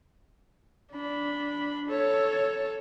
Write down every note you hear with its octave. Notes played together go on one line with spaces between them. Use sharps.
D4 B5
A4 C#5